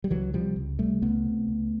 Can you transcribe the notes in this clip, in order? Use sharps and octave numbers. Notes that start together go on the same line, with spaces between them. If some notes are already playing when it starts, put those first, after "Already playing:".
G3
C#2 E3 F#3
C3 F3 G3
C#2
C3 G3 A3
C#2 A3 B3
C3
C#2